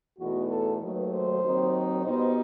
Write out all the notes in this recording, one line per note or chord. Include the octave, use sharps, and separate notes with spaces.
E2 B2 A3 D#4 F#4
A4
D#2 D#3 F#3 A3 B4
C5
D#2 D#3 F#3 C4 D#4
B2 G3 B3 D#4 C5